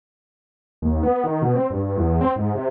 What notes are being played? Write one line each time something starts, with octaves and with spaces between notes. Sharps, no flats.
D#2
B3
D#3
B2
C4
G2
G2
E2
C4
G#2
C3